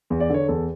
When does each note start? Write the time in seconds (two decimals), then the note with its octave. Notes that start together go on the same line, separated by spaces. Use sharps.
0.10 E2
0.20 D5
0.30 D3 C#5
0.48 E2 A4